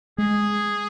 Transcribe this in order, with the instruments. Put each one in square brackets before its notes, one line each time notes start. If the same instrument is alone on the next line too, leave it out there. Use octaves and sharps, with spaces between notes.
[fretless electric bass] G#3 [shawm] G#4